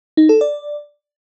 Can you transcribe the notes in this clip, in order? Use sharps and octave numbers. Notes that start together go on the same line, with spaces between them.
D#4
A4
D5